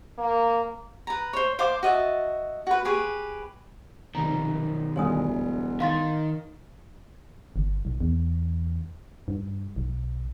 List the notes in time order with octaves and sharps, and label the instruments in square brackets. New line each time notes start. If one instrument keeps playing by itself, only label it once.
[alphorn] A#3
[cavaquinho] B4 A#5
C5 C#5
C5 F5 A5 D6
F#4 D#5 E5 A5
F#4 B4
G4 G#4 B4 C#6
[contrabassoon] F1 [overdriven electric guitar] B1 D#3 [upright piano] A#5
[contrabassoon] E1 [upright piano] D2 G2 [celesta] C#5 G#5 D#6
[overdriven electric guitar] D#3 [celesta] F5 C6 A6
[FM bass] G1
B1
E2
G2
B1